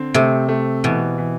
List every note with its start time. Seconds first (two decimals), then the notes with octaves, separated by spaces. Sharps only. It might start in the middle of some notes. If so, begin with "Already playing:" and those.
Already playing: D3 C4
0.14 C3 A3
0.49 A3
0.84 B2 E3
1.18 E3